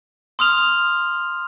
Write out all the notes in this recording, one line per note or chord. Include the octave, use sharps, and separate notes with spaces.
C6 D#6 F6 F7